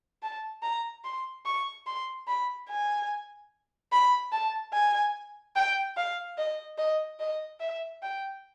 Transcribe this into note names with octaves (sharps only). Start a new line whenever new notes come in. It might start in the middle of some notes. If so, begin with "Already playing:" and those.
A5
A#5
C6
C#6
C6
B5
G#5
B5
A5
G#5
G5
F5
D#5
D#5
D#5
E5
G5